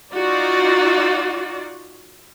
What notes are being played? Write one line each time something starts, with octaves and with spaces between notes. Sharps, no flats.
D#4 F4 F#4 D5